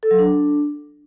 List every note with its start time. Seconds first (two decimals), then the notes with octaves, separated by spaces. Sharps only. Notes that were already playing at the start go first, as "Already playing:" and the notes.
0.03 A4
0.11 F#3
0.19 D4